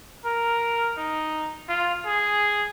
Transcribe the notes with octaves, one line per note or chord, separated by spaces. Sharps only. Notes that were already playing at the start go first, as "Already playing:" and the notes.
A#4
D#4
F4
G#4